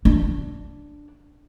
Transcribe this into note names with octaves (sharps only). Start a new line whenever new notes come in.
D4